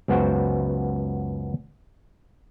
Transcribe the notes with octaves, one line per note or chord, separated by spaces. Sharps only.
C#2 F#2 B3 F#4 C5 G5